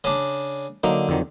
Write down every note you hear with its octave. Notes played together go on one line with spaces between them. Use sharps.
C#3 D4
D3 F#3 A#3 D#4
F2 D#3 F#3